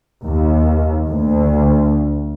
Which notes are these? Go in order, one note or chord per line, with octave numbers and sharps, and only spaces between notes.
D#2
D2